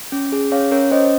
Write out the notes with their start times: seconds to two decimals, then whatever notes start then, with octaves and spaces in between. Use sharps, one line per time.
0.12 C#4
0.32 G#4
0.52 C#4 C#5 F5
0.71 C#4 A#4 C#5
0.91 C#4 C5 D#5